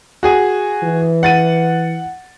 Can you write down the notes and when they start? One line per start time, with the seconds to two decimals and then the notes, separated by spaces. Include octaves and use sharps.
0.23 F#4 G#4 G#5
0.83 E3
1.23 F#5 A6 D#7